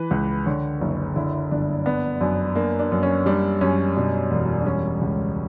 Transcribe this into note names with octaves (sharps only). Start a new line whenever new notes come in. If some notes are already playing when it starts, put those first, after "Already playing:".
Already playing: E3 B4
C#2
D3 C#5
F#1
D3 E4
G1 D4
B3 D4
F#2 D4
A#3 D4
D4
F#2
C#4
G3 D4
F#2 C#4
B2 D4
E1
D4
G3 C#4
C#2